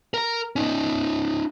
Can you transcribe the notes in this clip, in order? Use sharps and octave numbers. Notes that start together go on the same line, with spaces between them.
A#4 A#5
C#4 D#4